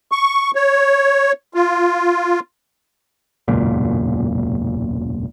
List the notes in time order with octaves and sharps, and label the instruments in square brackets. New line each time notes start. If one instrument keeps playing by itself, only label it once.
[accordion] C#6
C#5
F4
[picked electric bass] E1 C#2 F#2 A#2